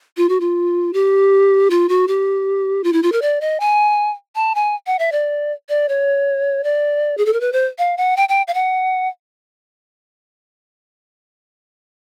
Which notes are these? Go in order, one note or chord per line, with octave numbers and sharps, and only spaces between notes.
F4
F#4
F4
G4
F4
F#4
G4
F4
E4
F4
A#4
D5
D#5
G#5
A5
G#5
F#5
E5
D5
D5
C#5
D5
G#4
A4
A#4
B4
C5
F5
F#5
G5
G5
F5
F#5